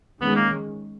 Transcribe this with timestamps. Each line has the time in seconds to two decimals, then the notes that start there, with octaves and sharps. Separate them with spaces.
0.21 D#3 G#3 B3 C#4
0.36 A#3